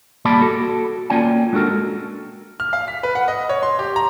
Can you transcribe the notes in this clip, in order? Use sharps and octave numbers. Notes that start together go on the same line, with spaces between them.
G3 A#3 D5 A5 B5
F#4 A4
A#3 C#4 F4 D5 G5 G#5
G#3 D4 F#4 A4 A#4
F6
F5
B6
B4
F#5
D#5
C#5
C6
G4
A#5